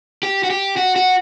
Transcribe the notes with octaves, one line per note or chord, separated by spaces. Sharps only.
G4
F#4
G4
F#4
F#4